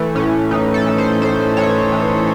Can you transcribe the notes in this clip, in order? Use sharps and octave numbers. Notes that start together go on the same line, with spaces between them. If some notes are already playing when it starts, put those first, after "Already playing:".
Already playing: E3 A3
A2 C#4
E3 D#4
A4
E3
C5
A2 C5
E3 C#5
E3